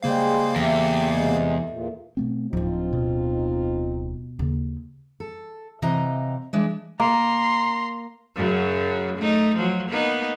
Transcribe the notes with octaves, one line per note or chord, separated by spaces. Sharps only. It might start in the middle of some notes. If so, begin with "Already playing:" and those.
C#3 G3 G#3 A#3 C5 F5
E2 A3 G4
C3 G#3
E2 A#2
B2 A3 C4
D1 F3 C4 D4 D#4 F4
B2
D#2 C#3
A4
C3 E3 D#5 F5 G5 A#5
E3 G#3 D4 E4
A#3 A#5 C6
F#2 C#3 F#3
A3 D#4
F3 F#3
A#3 B3 D#4